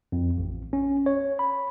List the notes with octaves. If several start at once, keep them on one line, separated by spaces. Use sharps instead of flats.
F2
A1
C#4
C#5
B5